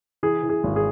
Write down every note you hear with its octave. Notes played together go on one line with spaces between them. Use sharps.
E3 G#4
E3
G#4
G#1
G#4